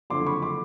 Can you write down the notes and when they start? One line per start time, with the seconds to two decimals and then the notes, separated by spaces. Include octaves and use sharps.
0.10 F#1 F2 D3 C6 D6
0.26 B5 C#6
0.42 C6 D6